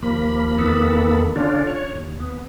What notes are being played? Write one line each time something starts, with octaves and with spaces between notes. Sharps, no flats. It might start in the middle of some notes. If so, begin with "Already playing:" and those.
D#2 F3 A#3 B5
E2 D#3 A#3 B3 A4 B5
D3 C#4 D4 F4
C#5
D#2
B3